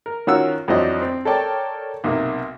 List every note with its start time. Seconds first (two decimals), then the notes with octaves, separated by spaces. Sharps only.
0.06 A#4
0.27 D#3 C#4 F4 F#4 A#4 E6
0.68 F2 E3 F#3 D4 C5 D#5
1.01 C4
1.25 A4 A#4 C#5 D5 G5 A5
2.04 B1 C3 A#3